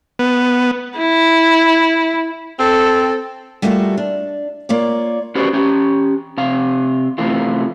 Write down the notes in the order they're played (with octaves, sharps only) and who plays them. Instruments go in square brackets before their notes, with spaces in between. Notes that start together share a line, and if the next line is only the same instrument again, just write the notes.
[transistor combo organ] B3
[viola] E4
[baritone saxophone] C4 [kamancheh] A4
[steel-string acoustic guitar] G3 A3 A#3 F4 F#4 A4
D4
A#3 F4 C#5 D5
[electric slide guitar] C#4 F#4 G4 B4 C5 D5
C#4 G4
C3 F5
C3 E3 A3 F4